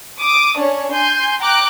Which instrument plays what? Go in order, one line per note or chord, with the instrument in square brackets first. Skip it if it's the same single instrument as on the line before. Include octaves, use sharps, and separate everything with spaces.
[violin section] D6 D#6
C#4 D4 C#5
G#5 C6 G6
G5 A#5 D6 F#6